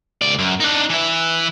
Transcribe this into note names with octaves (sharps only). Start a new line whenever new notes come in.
C#2 D5
F#2
D4 D#4
E3 E4